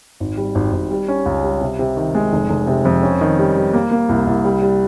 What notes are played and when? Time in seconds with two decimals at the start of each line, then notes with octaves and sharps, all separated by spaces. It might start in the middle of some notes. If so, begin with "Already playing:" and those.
0.20 G#1
0.37 G3
0.55 G#1
0.73 G#1
0.91 G3
1.08 C#4
1.26 C#2
1.44 G3
1.61 C3
1.79 C3
1.97 D#3
2.15 G#3
2.33 F1
2.50 F1
2.67 C3
2.85 F2
3.03 C#4
3.21 D#3
3.39 G3
3.56 G3
3.73 A#3
3.91 A#3
4.09 C2
4.27 C2
4.45 G3
4.62 G3